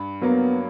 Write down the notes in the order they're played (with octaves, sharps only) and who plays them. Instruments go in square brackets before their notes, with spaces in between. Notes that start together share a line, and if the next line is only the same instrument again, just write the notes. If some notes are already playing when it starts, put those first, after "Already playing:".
Already playing: [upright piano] G2
[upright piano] F#3 A#3 [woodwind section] B3